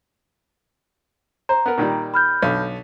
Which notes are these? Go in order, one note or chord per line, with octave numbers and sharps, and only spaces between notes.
C5 A#5
B3 A#4
A#2 D#3 G3
B5 F6 G6
B1 D3